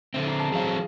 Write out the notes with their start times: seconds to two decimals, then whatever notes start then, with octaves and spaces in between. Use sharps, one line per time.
0.14 D3 C4 E5
0.27 E4 A#5 C7
0.40 A5
0.52 E3 F#3 C4 G#4 F5